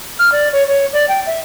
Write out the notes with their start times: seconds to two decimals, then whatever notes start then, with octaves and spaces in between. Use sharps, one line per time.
0.19 F6
0.32 D5
0.52 C#5
0.68 C#5
0.93 D5
1.08 G5
1.26 E5